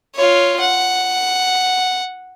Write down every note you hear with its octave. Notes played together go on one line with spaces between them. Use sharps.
F4 C#5
F#5